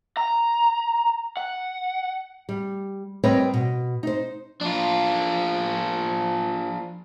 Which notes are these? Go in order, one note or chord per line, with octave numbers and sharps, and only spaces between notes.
A#5
F#5
G3
G3 C4 A#4 B4 C#5 D#5
B2
D#4 C5
F3 D4 F4